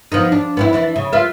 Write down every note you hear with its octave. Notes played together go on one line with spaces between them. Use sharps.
F3 B3 D#4
D4
B3 C4 E4
E3 D4 E4
C#3
F4 B4 E5